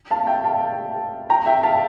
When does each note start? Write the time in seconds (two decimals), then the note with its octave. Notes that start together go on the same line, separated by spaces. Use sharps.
0.11 F5 A5
0.27 E5 G5
0.44 F5 A5
1.30 G5 A#5
1.46 E5 G5
1.63 F5 A5